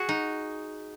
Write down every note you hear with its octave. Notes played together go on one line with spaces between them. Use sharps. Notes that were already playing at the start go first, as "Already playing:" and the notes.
Already playing: F#4 G#4
D#4